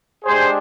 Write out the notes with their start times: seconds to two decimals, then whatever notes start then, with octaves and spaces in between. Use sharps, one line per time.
0.24 G#3 D4 G4 G#4 C5